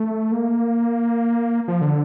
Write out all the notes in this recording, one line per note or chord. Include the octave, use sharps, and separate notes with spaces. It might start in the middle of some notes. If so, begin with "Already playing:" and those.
Already playing: A3
A#3
F3
D3